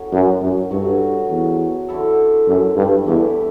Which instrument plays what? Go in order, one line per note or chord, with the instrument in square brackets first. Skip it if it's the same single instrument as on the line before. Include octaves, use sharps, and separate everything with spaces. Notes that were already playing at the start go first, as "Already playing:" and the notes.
Already playing: [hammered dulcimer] A2 F#3 C#4
[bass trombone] F#2
F#2
[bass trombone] G2 [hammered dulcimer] F#3 A3 C#4 F#4
[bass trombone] E2
[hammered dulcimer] D3 A3 E4 A4
[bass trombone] F#2
G2
[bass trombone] E2 [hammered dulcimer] E3 A3 E4 G4